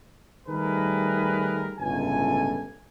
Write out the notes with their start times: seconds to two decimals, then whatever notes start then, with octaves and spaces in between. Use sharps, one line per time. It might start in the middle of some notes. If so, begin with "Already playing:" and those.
0.47 D#3 G3 A3 G#4 A#4 B4
1.79 G1 C#2 A2 A4 G#5